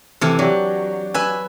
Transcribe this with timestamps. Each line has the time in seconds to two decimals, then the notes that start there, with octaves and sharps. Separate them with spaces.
0.21 C3 E3 A4 F6
0.39 F#3 D4 G4
1.14 B4 E5 G#5